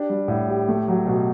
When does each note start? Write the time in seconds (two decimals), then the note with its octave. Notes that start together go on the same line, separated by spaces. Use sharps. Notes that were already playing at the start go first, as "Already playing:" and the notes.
Already playing: D4 G4
0.10 G3
0.28 A2
0.49 G4
0.68 A3
0.88 F#3
1.07 B2